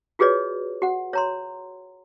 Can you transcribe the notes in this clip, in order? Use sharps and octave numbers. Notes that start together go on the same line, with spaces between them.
F4 F#4 G#4 B4 C#5 D5
F#4 F#5
C#5 A#5 C6